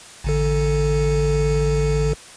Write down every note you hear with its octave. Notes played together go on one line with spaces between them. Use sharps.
A1 D3 A4